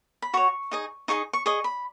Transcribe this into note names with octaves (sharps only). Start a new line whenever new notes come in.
B5
F#4 C#5 C#6
D#4 G#4 D#5
D#4 G#4 D#5 C#6
C#6
G#4 D#5 C#6
B5